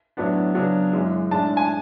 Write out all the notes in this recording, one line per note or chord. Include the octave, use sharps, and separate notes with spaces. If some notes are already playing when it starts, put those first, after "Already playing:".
A2 F#3 B3 D4
C#3 F#3 B3 D4
F#2 E3 G#3
A2 G#3 D4 A5
G#5